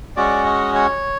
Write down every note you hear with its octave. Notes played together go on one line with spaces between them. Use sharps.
G#3 C#4 F#4 D5
D#5
C#5